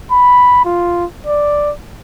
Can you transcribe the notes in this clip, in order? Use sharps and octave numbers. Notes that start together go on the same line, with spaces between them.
B5
F4
D5